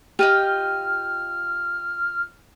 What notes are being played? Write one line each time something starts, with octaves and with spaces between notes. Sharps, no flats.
F4 G4 D#5 G5 F6